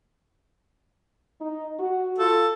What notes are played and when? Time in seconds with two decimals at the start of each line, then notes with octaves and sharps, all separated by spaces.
1.41 D#4
1.80 F#4
2.18 F4 A4